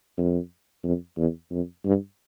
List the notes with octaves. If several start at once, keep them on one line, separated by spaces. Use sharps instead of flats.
F2
F2
E2
F2
G2